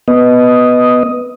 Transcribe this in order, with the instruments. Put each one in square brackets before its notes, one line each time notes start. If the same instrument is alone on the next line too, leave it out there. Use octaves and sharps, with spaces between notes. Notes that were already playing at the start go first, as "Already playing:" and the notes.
[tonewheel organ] B3 D#5